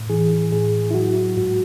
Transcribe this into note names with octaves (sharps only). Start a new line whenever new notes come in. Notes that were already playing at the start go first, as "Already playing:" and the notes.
Already playing: A2
E3 G#4
A2 G#4
E4
F#3 F#4
G#2 F#4